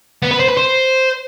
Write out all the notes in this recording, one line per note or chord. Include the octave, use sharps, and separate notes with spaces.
B3
B4
C5
B4
C5